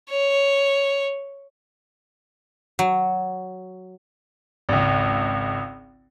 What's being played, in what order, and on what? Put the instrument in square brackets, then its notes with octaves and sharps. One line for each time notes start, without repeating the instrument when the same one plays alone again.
[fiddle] C#5
[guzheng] F#3
[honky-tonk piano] G#1 C#2